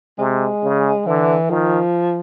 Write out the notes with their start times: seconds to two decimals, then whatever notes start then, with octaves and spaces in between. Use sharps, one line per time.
0.18 C3 G#3
0.63 C#3
1.06 D3 E3
1.50 D#3 F3